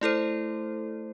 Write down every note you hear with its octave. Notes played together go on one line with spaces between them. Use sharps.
A3 E4 A4 C5